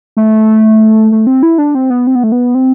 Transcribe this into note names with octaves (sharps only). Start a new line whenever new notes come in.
A3
A3
C4
E4
D4
C4
B3
C4
B3
A3
B3
C4